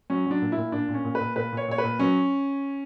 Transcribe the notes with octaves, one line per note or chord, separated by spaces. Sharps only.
F#3 C#4
F#3 D4
A#2
E4
A#2
A#2 D4
A#2
C#4
A#2
B4
A#2
A#2 B4
A#2 C#5
A#2 C#5
B4
A#2
F#3 C#4